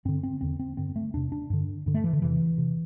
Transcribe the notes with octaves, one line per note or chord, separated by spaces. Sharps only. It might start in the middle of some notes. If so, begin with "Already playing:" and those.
G2 D3 C4
C4
E2 D3 C4
C4
G2 D3 C4
A3
E2 C3 D4
D4
G2 D3
G2 D3
A3
E3
D3
E2 C3 E3
C3